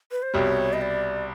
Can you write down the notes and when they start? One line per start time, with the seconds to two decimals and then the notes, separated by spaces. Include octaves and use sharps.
0.12 B4
0.22 C5
0.34 C2 B2 G3 C#5
0.73 D#5
0.81 D5